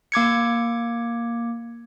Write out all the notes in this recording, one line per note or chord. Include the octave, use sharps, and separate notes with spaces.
A#3 D6 G#6 C#7